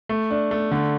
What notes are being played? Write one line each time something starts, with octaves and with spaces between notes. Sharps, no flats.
A3
D4
A3
D3